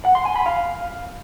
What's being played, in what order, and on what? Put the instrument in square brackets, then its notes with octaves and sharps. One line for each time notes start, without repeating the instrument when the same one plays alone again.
[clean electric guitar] F#5
C6
G#5
B5
F5